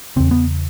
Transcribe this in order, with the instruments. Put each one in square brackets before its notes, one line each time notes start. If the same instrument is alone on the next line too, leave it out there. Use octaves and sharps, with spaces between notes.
[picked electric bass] E2 C#3 C4
B3